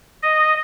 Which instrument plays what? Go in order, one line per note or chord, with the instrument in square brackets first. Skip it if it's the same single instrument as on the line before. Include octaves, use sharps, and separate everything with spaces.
[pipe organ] D#5